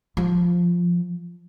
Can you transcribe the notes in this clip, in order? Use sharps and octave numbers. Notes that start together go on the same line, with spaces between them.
F3